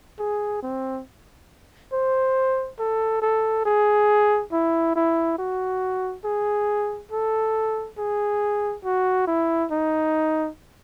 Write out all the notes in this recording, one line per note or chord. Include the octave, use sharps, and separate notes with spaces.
G#4
C4
C5
A4
A4
G#4
E4
E4
F#4
G#4
A4
G#4
F#4
E4
D#4